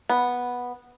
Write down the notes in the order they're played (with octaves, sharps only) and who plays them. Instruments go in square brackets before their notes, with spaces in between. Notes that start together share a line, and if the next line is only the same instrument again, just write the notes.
[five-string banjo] B3